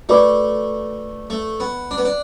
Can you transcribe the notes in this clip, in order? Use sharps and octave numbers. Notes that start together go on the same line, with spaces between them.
A3 F#4 B4 D5 B5 D6
A3
B3
D4
B3
D4